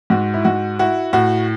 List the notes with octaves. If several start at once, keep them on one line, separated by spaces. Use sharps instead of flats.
G#2 F#4
E4
G#2 F#4
E4 F#4
A2 F#4